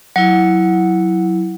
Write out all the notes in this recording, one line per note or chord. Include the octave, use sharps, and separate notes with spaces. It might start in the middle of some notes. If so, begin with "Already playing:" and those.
F#3 E4 F#5